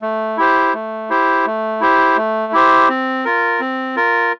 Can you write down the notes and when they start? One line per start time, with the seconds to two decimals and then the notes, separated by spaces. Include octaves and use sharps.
0.02 A3
0.37 E4 G4 C5
0.74 A3
1.10 E4 G4 C5
1.46 A3
1.81 E4 G4 C5
2.17 A3
2.53 E4 G4 C5
2.89 C4
3.25 F4 A#4
3.60 C4
3.96 F4 A#4